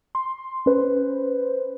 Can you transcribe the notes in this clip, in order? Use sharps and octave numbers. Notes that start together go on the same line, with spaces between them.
C6
C#4 B4 C5